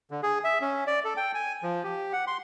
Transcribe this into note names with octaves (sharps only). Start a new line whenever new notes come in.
D3
G#4
E5
C#4
D5
A4
G5
G#5
F3
G4
F#5
C6